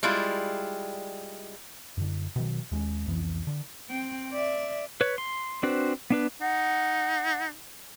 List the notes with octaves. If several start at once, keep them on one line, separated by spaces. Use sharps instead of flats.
G3 G#3 E4 F4
F#2 D3
B2 D#3 F#3
D#2 G#3 B3 C#4
C2 F2 E3 B3
D3
C4 G5
D5 E5
B4 C#5
C6
C4 D4 F#4 B4 C5
B3 D4 B4
D#4 F#5